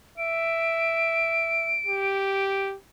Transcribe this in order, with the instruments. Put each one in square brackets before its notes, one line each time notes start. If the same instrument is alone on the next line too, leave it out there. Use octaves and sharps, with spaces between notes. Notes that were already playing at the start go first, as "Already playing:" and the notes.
[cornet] E5 [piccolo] D7
[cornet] G4